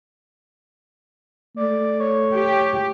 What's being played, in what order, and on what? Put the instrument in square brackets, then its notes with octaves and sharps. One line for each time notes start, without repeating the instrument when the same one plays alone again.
[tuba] A3 [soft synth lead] D5
[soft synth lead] C#5
[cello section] G4